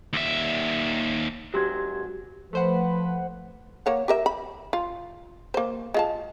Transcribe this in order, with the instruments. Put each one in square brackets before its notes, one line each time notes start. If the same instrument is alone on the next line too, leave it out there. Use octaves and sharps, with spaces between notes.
[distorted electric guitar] D#2 E5
[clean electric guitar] G#2 F#3 [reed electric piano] G4 C6 G#6
[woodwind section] F3 B4 [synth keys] A3 C5 F#5
[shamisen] A#3 C#5 F#5
G4 A#4 E5
B5
F4
A#3 C5
G#3 F4 A5